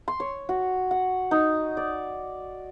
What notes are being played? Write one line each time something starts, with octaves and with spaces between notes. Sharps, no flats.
C6
C#5
F#4
F#5
D#4
D5